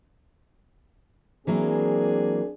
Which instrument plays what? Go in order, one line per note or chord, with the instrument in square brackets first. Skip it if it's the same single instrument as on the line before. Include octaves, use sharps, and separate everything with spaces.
[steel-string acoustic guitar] E3 F#3 A#3 [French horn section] C4 D4 G#4